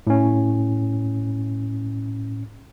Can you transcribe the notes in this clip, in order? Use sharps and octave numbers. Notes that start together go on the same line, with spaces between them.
A2 C#4